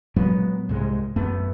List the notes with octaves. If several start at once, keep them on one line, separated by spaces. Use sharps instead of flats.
A#2 F#3 G#3 B3
C2 G#2 G#3
A#1 F#2 A3 B3